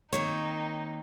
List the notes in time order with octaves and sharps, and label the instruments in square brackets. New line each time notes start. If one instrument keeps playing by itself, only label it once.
[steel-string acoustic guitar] D#3 A#3 C4 [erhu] D#4 [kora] C#5